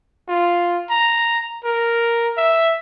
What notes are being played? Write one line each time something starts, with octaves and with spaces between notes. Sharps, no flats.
F4
A#5
A#4
E5